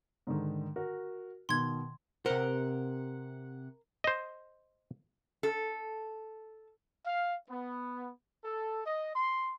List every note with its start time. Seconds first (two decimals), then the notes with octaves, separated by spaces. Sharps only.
0.27 G#2 D3 D#3
0.76 F#4 A#4
1.49 B2 D#3 C6 G#6
2.26 C3 A#4 C5 F#5
4.04 C5 D#5
5.43 A4
7.06 F5
7.49 B3
8.44 A4
8.85 D#5
9.15 C6